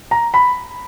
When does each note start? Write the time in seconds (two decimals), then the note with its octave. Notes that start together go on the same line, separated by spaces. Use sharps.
0.11 A#5
0.34 B5